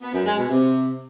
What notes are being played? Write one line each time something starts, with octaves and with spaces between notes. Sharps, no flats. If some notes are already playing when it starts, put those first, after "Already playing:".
B3
F#2
G#3
B2
C3